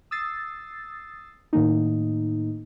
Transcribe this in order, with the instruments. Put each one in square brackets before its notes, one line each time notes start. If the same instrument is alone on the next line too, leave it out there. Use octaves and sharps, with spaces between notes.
[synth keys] D#6 E6 A6 C7
A2 D#3 A#3 D#4